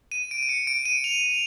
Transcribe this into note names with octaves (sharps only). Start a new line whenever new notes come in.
D#7
D7
D7
C#7
D7
D#7
F7